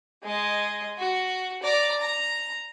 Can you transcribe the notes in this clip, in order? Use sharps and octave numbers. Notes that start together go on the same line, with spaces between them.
G#3 D#5
F#4
D5 A#5
A#5